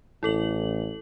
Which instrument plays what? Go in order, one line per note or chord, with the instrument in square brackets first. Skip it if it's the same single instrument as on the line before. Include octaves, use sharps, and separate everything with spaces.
[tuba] A1 [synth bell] E4 A4 F#7